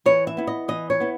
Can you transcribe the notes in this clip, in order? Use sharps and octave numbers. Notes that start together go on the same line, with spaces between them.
E3 C#5
E5
B3 E4
D#5
E3 D#5
C#5
B3 E4